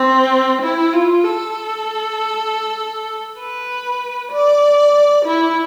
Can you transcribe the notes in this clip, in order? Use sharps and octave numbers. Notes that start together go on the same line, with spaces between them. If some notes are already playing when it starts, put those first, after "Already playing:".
Already playing: C4
E4
F4
A4
B4
D5
E4